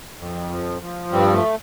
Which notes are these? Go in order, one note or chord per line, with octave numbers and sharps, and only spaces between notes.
F2
F3
F3
G2 G3 C4
A3